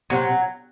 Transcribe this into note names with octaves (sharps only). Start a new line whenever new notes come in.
C3 F#3